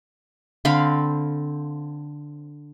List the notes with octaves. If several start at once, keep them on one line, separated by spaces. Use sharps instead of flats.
D3 C4 F5 B5